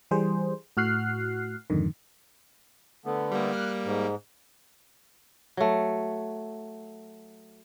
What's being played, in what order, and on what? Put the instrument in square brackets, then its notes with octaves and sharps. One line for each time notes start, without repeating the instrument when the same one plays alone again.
[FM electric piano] E3 G3 G#4 C5
A2 F#4 F6 F#6 C7
F2 G#2 D3 D#3
[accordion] D3 A3 B3
[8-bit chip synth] G3 A#3
[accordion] F6 F#6
G#2
[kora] F#3 A3